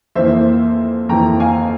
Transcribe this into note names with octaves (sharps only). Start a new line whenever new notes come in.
F2 E3 A#3 C5 E5
F2 E3 A#3 G5 A#5
F5 G#5